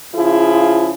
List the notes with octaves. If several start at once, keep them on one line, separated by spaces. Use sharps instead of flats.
C#3 F3 E4 F4 G#4